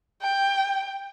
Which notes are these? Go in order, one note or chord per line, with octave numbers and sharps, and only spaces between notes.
G5